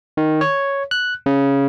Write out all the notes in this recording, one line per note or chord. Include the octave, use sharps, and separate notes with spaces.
D#3
C#5
F#6
C#3